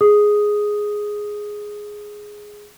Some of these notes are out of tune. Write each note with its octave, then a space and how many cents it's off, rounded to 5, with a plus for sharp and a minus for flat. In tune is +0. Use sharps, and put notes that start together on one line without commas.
G#4 +0 D#6 +0